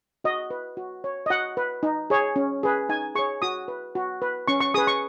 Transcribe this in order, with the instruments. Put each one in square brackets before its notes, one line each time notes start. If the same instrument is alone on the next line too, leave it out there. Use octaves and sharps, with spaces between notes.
[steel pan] F#4 D#5
B4
F#4
C#5
D#5
F#4 F#5
B4
D#4
G#4 C#5
C#4
G#4 B4
D#4 G#5
G#4 C#5 C#6
F#4 D#6
B4
F#4
B4
C#4 C#6
C#6
G#4 B4 D#6
C#6